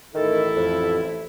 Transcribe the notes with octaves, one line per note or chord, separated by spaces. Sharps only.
A1 D#3 E4 A4
F2